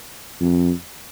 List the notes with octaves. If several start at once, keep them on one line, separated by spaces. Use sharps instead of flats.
F2